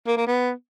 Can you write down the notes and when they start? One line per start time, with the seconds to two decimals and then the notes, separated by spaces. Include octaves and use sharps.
0.07 A#3
0.17 A#3
0.27 B3